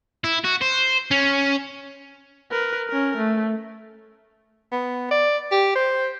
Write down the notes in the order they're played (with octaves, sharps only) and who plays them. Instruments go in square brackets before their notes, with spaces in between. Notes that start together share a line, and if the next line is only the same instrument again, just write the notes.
[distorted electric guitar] E4
F#4
C5
C#4
[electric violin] A#4 B4
C#4 A#4
A3
[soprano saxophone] B3
D5
G4
C5